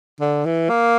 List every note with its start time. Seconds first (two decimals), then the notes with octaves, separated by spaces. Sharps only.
0.20 D3
0.45 E3
0.69 A#3